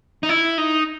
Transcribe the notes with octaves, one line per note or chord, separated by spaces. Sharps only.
D#4
E4
D#4